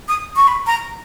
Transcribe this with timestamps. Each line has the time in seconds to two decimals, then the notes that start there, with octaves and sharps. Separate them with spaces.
0.08 D#6
0.36 C#6
0.48 B5
0.67 A#5